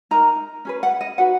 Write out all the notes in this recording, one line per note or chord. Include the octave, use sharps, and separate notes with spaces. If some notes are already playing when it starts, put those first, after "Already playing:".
D#4 A#4 A#5
C#4 G#4 B4
F#5
D#5
D#4 F#4 B4 F#5